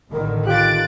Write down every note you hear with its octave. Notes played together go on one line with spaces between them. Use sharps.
A1 D3 D#3 A#4
F4 G4 F#6 A6 D7